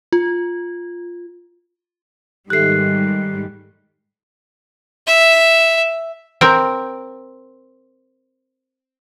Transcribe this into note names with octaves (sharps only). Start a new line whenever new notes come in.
F4
G#2 D#3 G3 G4 A4 E5 F#6 C7
E5
C4 A#4